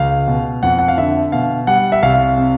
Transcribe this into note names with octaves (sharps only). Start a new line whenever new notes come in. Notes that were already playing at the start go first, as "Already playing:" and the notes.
Already playing: C#2 F5
B2
F2 F#5
F#5
F5
D3 E5
B2 F5
G3 F#5
E5
C2 F5
C3